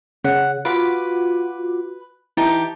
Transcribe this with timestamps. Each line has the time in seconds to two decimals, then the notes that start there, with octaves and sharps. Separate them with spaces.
0.24 C#3 F#5
0.65 F4 F#4 B4 B5 D6
2.37 E3 D#4 G4 A5